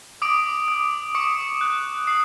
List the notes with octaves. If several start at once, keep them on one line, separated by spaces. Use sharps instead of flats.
D6 D#6 D7
D#6
C#6 D#6 C#7
F#6
D#6 C7